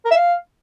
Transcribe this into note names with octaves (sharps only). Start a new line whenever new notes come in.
A#4
E5
F5